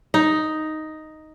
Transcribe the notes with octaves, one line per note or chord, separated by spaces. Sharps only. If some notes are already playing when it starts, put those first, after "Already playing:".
D#4